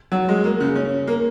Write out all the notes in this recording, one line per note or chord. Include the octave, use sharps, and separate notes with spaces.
F#3
G#3
A#3
C#3
C#4
A#3